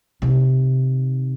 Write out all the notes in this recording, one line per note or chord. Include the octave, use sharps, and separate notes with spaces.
C3 D#3